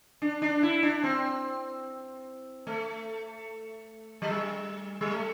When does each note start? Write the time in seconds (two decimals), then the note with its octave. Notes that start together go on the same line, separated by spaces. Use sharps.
0.22 D4
0.42 D4
0.63 E4
0.83 D4
1.04 C4
2.67 A3
4.22 F#3
4.31 G3
5.01 G3
5.12 A3